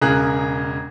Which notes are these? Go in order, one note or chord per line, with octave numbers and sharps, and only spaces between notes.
E1 C#3 G#4 A#4 F#6